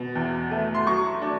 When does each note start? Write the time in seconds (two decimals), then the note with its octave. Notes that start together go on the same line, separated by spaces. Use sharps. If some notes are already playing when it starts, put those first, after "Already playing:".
Already playing: B2
0.15 E2
0.51 A3
0.75 C6
0.87 F#3 C#6
1.22 D4